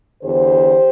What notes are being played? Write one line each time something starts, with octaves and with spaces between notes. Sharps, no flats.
E2 D3 G4 C5